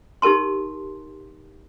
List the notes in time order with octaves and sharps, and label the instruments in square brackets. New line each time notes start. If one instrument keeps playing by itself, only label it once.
[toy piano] D#4 G4 A#4 A5 C6